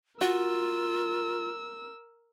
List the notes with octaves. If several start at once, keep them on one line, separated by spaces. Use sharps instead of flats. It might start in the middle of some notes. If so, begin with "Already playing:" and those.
F4 F#4 A#4 E6